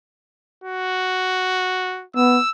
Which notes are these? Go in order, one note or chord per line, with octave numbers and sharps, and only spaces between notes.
F#4
B3 E6